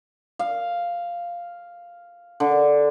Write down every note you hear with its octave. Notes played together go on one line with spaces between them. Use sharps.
F5
D3